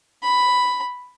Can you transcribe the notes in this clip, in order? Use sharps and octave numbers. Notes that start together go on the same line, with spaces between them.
B5